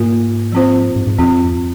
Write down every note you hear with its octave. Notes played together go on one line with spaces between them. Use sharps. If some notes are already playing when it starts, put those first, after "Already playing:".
Already playing: G#2 A#3 F4 A#4
F3 C4 F4 C5
G#2
G#2
F2 F3 C4 F4